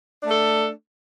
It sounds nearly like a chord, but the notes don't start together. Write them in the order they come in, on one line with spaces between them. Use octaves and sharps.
D4 A3 A4